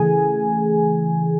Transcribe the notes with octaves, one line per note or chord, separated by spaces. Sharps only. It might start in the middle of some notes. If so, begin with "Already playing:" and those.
Already playing: C#3 E3 A3 G#4 G#5